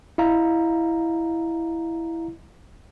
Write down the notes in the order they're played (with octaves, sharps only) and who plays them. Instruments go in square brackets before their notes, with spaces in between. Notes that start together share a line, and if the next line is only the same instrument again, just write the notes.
[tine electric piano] E4 D#5 F5 A#5